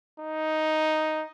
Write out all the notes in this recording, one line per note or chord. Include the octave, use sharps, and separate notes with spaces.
D#4